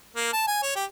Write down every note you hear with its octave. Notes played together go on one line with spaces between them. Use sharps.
A#3
A5
G#5
C#5
G4